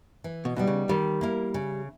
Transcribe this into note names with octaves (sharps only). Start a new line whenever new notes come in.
E3
B2
B2 G3 B3 D#4
C#3
D#3 G3
A#3 E4 A#4
C#3